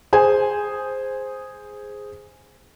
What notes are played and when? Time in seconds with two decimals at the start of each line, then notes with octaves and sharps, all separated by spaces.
0.13 G#4 C5 G#5